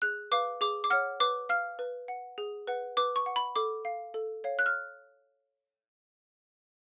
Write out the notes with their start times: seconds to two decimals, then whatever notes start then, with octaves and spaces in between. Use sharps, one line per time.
0.02 G#4 F#6
0.32 B4 F5 D6
0.61 G#4 D6
0.84 D6
0.90 C#5 F#5 F6
1.20 B4 D6
1.49 F5 F6
1.79 B4
2.08 F#5
2.38 G#4
2.67 B4 F#5
2.97 B4 D6
3.16 C#6
3.26 F#5
3.36 B5
3.56 A4 D6
3.85 F5
4.14 A4
4.44 C#5 F5
4.59 F#6
4.66 F6